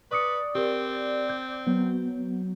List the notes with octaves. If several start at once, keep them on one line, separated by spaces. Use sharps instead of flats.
B4 D5 C#6 D#6 C#7
C4 G4 A#4
G6
F#3 B3